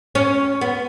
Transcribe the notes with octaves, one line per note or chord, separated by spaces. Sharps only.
C#4
B3